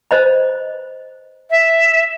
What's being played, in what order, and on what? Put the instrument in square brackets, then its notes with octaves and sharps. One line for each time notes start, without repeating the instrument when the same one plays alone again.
[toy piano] C5 D#5 B5
[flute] E5